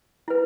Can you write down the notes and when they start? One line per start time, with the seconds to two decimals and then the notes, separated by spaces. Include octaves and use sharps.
0.28 E4 B4